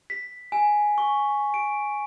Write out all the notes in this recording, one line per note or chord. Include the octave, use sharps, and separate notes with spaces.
B6
G#5
C#6
D7